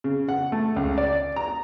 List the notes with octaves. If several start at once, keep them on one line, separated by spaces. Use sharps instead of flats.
C#3
F#5
A3
C#2
D5
A#5